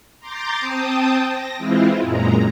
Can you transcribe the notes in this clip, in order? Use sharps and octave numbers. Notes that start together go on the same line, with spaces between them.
A#5 C6 D6 G6 A6
C4 G5 A5 D#6
A#6
E3 G#3 C4 E4 F4
F#2 A#2 G#3 A#5